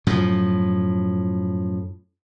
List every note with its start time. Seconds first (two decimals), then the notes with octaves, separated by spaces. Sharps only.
0.07 F#2 A2 F3